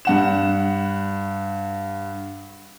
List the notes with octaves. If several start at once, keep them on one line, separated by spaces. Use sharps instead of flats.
G2 F#5 E7